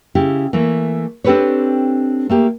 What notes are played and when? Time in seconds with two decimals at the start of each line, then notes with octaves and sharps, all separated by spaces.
0.15 C#3 E4 G4
0.53 E3 A3 A#3
1.24 C4 D4 G4 A4 B4 C#5
2.29 A3 A#3 G4